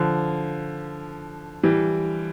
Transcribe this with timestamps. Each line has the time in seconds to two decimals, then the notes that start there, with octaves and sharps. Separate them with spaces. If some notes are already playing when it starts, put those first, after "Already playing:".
Already playing: D3 F3
1.63 E3 G3